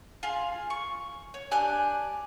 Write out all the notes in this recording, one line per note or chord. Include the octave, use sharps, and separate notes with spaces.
F4 G#4 F5
C#6
C#5
D4 G4 G#5 F#6